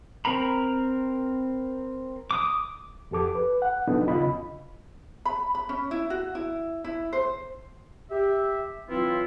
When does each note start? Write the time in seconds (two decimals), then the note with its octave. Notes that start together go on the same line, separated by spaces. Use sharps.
0.25 C4 A#4 A#5 B5
2.31 D6 D#6
3.11 F2 G4 A4 D6
3.35 B4
3.62 F#5
3.87 C3 F#3 B3 D4 D#4 A4
4.06 D#2 C#3 F4 D#5 B5
5.25 B5
5.55 B5
5.69 C#4
5.91 E4
6.10 F#4
6.35 E4
6.84 E4
7.13 C5
8.11 G4 E5
8.89 E3 F#3 C4 E4 F4